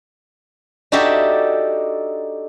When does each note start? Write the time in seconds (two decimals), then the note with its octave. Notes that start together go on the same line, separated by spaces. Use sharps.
0.92 D4 D#4 F#4 G4 A4 E5